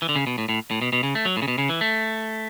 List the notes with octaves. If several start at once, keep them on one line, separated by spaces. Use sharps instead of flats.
E3
D3
C#3
B2
A2
A2
A2
B2
B2
C#3
A3
F#3
A2
C#3
B2
C#3
E3
A3